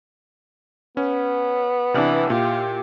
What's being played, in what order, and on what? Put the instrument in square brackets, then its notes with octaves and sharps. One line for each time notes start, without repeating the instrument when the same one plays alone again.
[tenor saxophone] B3 [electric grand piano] C#4
[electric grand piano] C3 D4 [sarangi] E3
[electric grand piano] A#2 [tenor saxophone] F4 [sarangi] G4